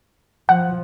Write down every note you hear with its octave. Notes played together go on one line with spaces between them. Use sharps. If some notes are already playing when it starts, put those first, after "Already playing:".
F3 F#5